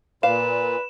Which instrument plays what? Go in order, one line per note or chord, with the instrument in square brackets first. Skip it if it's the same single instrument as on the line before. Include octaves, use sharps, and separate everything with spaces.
[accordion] A#2 [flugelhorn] B4 [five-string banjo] D5 F5 [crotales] E7